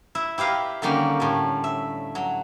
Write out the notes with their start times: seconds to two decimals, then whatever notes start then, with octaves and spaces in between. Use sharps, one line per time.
0.15 E4 E5
0.38 E4 G4 B4 F5 A#5
0.82 D3 D#3 G3 A#3 C#4
1.20 A2 G3
1.64 E5
2.15 F#3